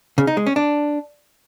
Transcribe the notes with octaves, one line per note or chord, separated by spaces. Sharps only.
C#3
D#4
G#3
C#4
D4